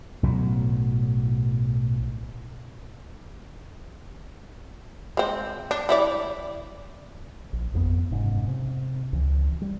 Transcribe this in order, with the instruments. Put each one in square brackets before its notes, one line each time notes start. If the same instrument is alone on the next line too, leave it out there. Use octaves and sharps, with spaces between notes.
[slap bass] B1 A2 F#3
[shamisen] G#3 C4
D4
G3 E4 D5
[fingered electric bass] A#1
G#1 F2 D#3 B3
F#1 G#2 C3 C#4
C3
C#2 E3
G3